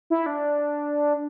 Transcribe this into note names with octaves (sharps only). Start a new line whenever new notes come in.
E4
D4